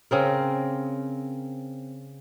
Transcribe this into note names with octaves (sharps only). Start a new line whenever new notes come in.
C#3 C4 A#4